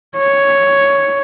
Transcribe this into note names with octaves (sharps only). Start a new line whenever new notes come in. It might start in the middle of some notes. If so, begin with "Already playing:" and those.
C#5